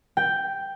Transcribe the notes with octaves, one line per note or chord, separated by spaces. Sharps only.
G5